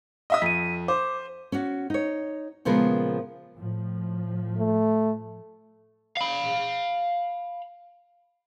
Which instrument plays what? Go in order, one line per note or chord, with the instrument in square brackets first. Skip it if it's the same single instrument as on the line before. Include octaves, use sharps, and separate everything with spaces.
[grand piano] D#5 E5 D#6
[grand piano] F2 [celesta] B6 D#7
[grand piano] C5 [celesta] D6
[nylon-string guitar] C#4 F#4
D#4 C#5
A#2 C#3 F3 G#3 B3 A#4
[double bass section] A2 F3
[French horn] A3
[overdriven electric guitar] F5 B5